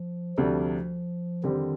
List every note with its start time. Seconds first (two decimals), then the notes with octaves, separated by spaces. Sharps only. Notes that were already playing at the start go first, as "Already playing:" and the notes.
Already playing: F3
0.37 D2 C3 F3 G3 D4 A4
1.44 F2 D3 D#3 G3 C4 G4